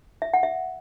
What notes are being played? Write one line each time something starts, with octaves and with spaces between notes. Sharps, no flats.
E5
F#5
E5